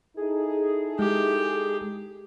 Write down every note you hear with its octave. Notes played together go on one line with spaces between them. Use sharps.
D#4 E4 G#4 A4
G#3 G4